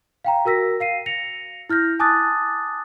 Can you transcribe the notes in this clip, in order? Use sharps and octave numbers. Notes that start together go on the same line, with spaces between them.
F5 G5 A#5
F#4 A#4 E6 A#6 B6
F5 C7 D#7
A#6 C#7 F7
E4 F6 G6 A#6
G#5 A5 D6 D#6 F#6 A6